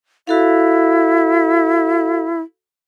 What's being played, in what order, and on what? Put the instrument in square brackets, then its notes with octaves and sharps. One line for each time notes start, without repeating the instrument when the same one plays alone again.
[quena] E4 [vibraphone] F#4 A4 F5